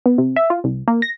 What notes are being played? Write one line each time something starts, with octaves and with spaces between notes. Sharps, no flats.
B3
C3
E5
F4
C2
A#3
A#6